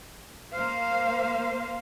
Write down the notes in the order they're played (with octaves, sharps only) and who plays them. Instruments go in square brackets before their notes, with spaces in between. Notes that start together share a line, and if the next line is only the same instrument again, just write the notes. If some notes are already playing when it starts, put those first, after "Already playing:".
[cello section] A#3 C5 F5